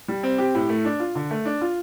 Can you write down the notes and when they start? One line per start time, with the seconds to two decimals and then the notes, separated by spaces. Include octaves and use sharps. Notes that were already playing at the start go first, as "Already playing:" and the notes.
0.08 G3
0.23 C4
0.38 G4
0.55 A2
0.69 A3
0.85 D4
1.00 F4
1.15 D3
1.31 A3
1.45 D4
1.61 F4